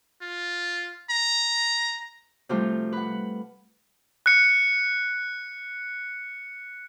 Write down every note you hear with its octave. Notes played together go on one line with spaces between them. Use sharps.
F4
A#5
C3 F3 G3 A3 F4
B4 F#5
F#6 C#7